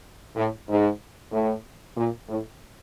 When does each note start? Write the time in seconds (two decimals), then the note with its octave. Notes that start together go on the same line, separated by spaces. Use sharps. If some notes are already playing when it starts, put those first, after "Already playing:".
0.36 A2
0.68 G#2
1.32 A2
1.96 A#2
2.28 A2